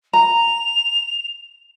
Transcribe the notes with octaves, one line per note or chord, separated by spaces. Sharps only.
A#5 F7